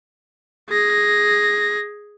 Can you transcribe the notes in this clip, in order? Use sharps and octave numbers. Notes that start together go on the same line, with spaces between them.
G#4 A#6